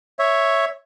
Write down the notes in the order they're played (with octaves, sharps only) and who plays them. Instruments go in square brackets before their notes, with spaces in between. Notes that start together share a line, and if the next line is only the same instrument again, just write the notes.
[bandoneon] C#5 E5